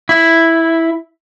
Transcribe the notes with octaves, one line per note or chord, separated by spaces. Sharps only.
E4